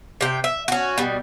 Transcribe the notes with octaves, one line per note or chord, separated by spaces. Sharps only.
C3 G5
E5
C#4 F#4
B2 G3